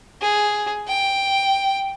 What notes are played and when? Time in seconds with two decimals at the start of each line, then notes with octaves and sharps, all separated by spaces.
0.21 G#4
0.88 G5